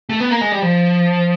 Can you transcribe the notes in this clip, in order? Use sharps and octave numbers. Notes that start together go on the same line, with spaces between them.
A3
B3
A#3
G#3
G3
F3